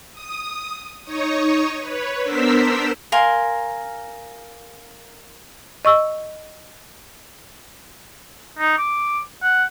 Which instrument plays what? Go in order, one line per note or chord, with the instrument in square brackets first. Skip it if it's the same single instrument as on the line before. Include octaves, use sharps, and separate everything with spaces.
[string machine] D#6
D#4 C#5 C#6 D#6
B4 C#5
B3 D4 A#4 C5 E6 B6
[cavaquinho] A#4 F5 G#5 C6
[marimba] D#5 C#6 E6
[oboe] D#4
D6
F#5